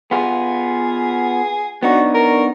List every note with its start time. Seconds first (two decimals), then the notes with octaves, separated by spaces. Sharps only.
0.11 B3 F4 G#4
1.83 B3 D4 D#4 F#4 D5 C#6
2.15 A#4